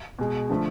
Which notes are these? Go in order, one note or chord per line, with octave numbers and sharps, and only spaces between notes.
B2 G#3
D3 F3 A3